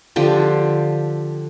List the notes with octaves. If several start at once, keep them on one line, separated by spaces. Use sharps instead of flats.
D3 F3 G4